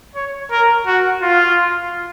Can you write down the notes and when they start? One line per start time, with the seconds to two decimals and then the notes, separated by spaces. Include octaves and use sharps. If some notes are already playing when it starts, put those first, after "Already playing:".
0.15 C#5
0.51 A#4
0.87 F#4
1.22 F4